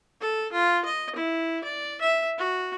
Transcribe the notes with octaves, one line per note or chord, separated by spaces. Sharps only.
A4
F4
D#5
E4
D5
E5
F#4